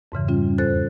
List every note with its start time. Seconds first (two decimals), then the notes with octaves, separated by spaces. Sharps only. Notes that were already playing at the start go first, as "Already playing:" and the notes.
0.12 F2 G#2 C#3 E3
0.28 G3 C#4 F4
0.58 E2 F4 A4 C5 F#6 A6